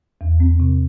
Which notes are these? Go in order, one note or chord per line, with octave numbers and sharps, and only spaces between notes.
E2
C4
C3